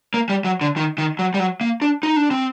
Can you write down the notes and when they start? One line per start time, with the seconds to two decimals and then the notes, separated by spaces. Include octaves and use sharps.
0.14 A#3
0.29 G3
0.45 F#3
0.61 D3
0.77 D#3
0.98 D#3
1.19 F#3
1.34 G3
1.39 F#3
1.61 A#3
1.82 D4
2.03 D#4
2.16 D4
2.31 C4